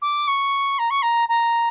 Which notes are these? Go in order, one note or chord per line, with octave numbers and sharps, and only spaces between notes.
D6
C#6
A#5
C#6
A#5
A#5